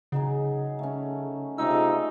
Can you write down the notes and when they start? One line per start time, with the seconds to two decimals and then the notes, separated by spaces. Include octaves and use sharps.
0.12 C#3 F#3 D#4 G#4
0.79 A3 C#4
1.58 C3 G#3 A3 D4 D#4 F4 E6